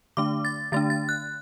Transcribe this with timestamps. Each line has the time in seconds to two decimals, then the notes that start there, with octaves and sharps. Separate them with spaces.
0.17 D3 A3 D4 D6
0.45 A6
0.72 D3 A3 D4 A6
0.90 A6
1.09 F#6